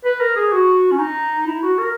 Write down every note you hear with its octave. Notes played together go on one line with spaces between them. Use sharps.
B4
A#4
G#4
F#4
C#4
D#4
E4
F#4
A#4